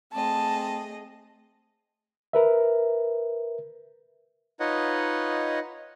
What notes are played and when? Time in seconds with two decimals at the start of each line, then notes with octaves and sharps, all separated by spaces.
0.13 A3 C4 G#4 D#5 A5
2.33 A#4 B4 E5
4.60 D#4 F4 B4 C#5 D#5 F#5